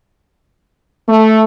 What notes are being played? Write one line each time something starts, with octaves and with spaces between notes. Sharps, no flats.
A3